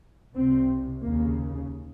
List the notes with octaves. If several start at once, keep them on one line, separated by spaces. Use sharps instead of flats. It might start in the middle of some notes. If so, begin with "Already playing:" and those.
C2 C3 C4
D#2 C#3 A#3